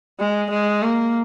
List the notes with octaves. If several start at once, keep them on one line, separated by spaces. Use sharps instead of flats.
G#3
G#3
A#3